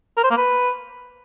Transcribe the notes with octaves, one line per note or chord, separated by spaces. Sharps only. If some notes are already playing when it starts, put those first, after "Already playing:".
A#4
C5
A#3
B4